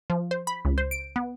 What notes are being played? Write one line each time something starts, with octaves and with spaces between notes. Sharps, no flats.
F3
C5
B5
C#2
C5
D7
B3